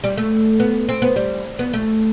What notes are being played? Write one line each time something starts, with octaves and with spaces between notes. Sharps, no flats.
G3
A3
B3
C4
B3
G3
B3
A3